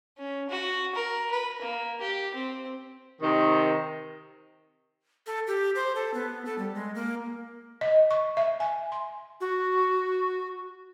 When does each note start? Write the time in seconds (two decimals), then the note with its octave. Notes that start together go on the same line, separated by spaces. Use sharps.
0.18 C#4
0.50 F#4
0.95 A#4
1.31 B4
1.62 A#3
2.01 G4
2.35 C4
3.21 C3 D#3
5.27 A4
5.47 G4
5.75 C5
5.95 A4
6.14 B3
6.45 A4
6.58 G3
6.75 G#3
6.95 A#3
7.81 D#5
8.11 C#6
8.37 E5
8.60 G#5
8.92 C6
9.41 F#4